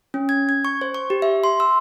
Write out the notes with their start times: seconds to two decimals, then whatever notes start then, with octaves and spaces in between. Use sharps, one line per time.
0.14 C#4
0.29 G#6
0.49 G#6
0.65 C#6
0.81 C5
0.94 C#6
1.10 G4
1.22 E5
1.44 C6
1.60 E6